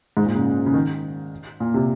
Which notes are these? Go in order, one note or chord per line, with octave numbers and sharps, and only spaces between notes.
G#2
A#2
C#3
C#3
D#3
A#2
C3